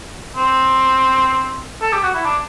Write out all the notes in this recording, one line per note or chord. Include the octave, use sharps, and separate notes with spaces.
C4
A4
G4
F#4
E4
D4